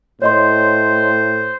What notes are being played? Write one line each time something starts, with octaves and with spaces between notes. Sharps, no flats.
A2 C5 C#5 D#5 C6